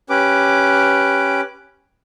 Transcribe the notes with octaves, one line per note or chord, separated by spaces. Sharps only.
C#4 G4 B4 D6